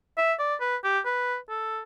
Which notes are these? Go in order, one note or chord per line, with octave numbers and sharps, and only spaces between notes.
E5
D5
B4
G4
B4
A4